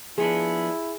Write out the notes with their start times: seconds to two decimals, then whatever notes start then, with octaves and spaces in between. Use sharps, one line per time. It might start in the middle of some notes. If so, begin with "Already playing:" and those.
0.18 F3 B3 D4 E4 G#4